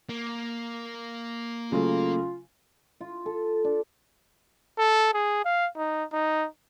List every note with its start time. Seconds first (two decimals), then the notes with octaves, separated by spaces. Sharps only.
0.09 A#3
1.72 C#3 F#3 A3 F4
3.01 F4
3.26 A4
3.64 D4
4.78 A4
5.14 G#4
5.45 F5
5.77 D#4
6.13 D#4